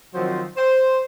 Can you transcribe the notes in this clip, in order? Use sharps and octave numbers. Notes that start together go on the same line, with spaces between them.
D#3 F3 F#3 C4 C5
C5